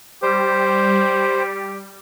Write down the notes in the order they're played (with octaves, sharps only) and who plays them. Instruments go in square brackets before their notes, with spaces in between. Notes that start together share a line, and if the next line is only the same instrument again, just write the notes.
[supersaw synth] G3 [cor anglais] G4 [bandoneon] C5